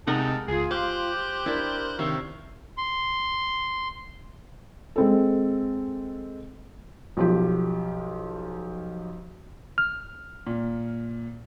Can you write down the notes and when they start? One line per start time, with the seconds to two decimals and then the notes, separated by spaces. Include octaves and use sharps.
0.07 C3 G#3 A3 D#4 A#4 F#5 A5
0.48 C#2 F4 G#4
0.71 G4 C5 F5 F#6 G6
1.46 D4 E4 A#4
1.99 C3 D#3 C#5 E5 F5
2.78 C6
4.96 G#3 C4 A4
7.17 B1 F3 G4
9.78 F6
10.47 A#2